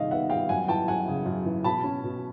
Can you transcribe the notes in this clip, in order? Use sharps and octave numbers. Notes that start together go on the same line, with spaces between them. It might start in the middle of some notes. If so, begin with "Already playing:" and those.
Already playing: C3 D#3 G3 D#5 F5
B3 E5 F#5
G3 F5 G5
F#2 F#5 G#5
E3 G5 A5
F#2 F#5 G#5
C#3
F#2
E3
B2 A5 B5
C#4
B2